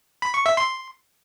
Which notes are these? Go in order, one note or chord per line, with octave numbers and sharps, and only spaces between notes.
B5
C#6
E5
C6